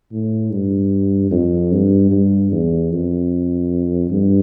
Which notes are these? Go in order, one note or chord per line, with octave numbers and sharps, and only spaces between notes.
A2
G2
F2
G2
G2
E2
F2
G2